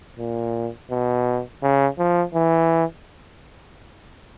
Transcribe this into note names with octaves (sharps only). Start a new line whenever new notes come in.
A#2
B2
C#3
F3
E3